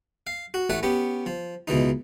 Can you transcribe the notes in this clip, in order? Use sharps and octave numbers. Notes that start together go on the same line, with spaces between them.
F5
F#4
A1 A3 C#5 F#5 G#5
B3 C#4 G4
F3
C#2 B2 E3 D#4